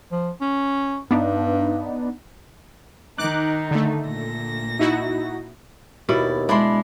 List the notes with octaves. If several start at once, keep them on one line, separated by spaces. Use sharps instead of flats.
F3
C#4
G2 B3 D4 D#4
D#3 D#4 D6 F#6
D3 A3
A#2 A#6
D#4 E4 F#4
D#2 B2 E4 D5
G#3 D4 E4 B5 C6